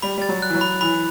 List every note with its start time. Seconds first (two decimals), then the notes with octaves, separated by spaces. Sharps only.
0.02 G3 B5
0.17 G3 A6
0.29 F#3
0.42 F#6
0.50 E3
0.55 F#3
0.61 B5
0.81 E3 B5